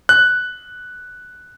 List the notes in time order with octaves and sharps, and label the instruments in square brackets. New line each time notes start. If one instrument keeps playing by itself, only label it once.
[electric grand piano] F#6